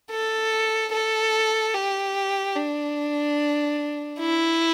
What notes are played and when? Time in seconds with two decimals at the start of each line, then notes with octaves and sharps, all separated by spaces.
0.11 A4
0.93 A4
1.74 G4
2.56 D4
4.20 E4